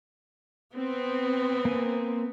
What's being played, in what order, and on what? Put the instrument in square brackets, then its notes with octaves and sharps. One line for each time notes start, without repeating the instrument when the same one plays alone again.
[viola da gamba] B3 [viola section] C4
[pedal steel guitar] A#3 G#5